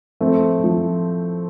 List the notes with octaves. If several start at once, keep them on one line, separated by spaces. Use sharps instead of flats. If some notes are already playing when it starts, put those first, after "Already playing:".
A2 F3 A3 C4
A2 F3